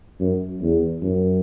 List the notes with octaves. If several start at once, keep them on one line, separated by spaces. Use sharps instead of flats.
F#2
E2
F#2